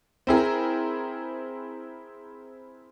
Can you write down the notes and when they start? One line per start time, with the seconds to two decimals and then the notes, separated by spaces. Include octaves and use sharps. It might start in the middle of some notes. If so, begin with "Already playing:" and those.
0.27 C4 E4 G#4 A#4